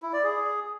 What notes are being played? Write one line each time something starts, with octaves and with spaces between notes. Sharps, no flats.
E4
D5
G#4